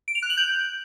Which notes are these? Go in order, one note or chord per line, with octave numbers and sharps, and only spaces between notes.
D7
F7
F#6
F#7
G6